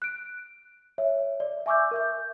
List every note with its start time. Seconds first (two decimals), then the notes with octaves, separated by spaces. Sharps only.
0.02 F#6 D7
0.98 C#5 E5
1.40 D5
1.66 E5 G#5 C#6 D6 E6 G6
1.91 A#4 E5 G6